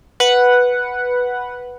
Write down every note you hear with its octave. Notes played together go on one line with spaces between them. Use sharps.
B4 F#5